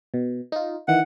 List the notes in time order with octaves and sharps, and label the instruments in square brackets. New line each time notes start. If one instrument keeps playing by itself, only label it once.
[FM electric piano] B2
D#4 F4
[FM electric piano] D#3 E3 [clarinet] F#5